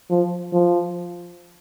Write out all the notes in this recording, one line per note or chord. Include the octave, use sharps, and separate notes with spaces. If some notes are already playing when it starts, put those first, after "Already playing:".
F3
F3